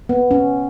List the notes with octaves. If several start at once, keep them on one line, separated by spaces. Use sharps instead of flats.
B3
C#4